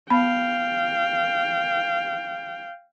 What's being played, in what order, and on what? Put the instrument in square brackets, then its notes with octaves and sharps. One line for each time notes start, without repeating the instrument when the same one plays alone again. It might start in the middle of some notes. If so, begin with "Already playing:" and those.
[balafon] B3 B5 [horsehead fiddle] F5 G5